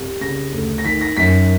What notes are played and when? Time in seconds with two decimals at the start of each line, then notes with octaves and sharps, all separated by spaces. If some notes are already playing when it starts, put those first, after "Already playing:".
Already playing: C2
0.21 C#3 A#6
0.53 D2
0.78 A#6
0.85 D#3 B6
1.01 A#6
1.17 F#2 B6